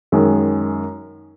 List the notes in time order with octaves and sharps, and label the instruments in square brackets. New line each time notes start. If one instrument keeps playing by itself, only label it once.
[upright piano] F#2 D#3 G#3